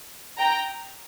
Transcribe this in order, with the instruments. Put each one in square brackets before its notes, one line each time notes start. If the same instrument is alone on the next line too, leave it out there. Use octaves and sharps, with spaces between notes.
[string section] G5 A#5